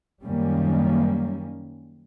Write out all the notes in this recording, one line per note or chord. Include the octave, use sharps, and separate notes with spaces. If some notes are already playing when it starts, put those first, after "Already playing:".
F#2 D#3 G3 A#3 C#4